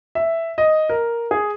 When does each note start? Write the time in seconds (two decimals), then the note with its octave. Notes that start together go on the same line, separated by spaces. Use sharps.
0.15 E5
0.58 D#5
0.89 A#4
1.31 G#4